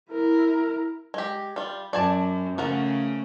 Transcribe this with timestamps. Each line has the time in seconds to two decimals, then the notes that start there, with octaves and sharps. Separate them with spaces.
0.11 E4 A#4
1.14 G#3 G4
1.56 G3 F4
1.93 F#2 D5 G#5 A5
2.58 C#3 F3 A3 A#4 F#5